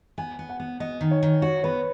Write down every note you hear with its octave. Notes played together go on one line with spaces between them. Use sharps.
B3 G#5
B3
F#5
B3
B3 D#5
D#3
C#5
D#3
F#4 C#5
B3 B4